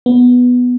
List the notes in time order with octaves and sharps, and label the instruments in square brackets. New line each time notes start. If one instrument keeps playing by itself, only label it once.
[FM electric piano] B3